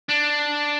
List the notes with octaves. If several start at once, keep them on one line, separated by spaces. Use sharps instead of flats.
D4